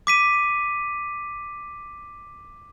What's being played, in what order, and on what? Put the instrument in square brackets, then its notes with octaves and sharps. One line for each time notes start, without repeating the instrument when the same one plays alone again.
[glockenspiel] D6 B6 D#7